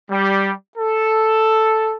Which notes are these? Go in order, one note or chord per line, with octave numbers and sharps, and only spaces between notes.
G3
A4